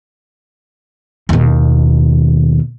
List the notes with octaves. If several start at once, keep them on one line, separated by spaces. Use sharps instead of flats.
D#2 B2